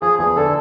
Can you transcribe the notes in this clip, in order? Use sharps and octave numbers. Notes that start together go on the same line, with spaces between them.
F3 G#4
E2 G#4
D3 A4